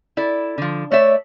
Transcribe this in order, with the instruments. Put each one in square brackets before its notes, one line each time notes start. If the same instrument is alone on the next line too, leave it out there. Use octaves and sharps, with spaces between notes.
[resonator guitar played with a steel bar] E4 A4 D5
D3 F3
[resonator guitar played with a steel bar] A3 D5 E5 [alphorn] C#5